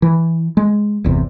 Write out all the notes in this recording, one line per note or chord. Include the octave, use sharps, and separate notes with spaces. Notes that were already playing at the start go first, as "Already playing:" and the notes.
E3
G#3
G1 E2 C3